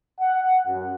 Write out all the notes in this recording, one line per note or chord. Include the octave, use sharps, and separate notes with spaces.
F#5
F#2